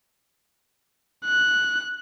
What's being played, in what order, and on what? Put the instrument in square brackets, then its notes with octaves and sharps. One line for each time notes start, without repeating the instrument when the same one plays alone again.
[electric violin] F#6